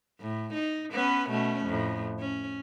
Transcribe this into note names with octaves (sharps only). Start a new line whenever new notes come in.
A2
D#4
B3 C#4 B4
B2 A3 C#4
F2 A2
C#4